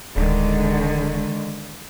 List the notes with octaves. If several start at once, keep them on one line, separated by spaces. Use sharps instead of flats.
D1 D3 D#3 G#3